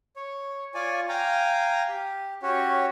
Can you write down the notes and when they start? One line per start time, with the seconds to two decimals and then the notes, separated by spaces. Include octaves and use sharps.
0.16 C#5
0.74 F4 C#5 D5 G#5
1.09 F5 G5 G#5 A#5
1.89 G4
2.42 C#4 F#4 G4 C#5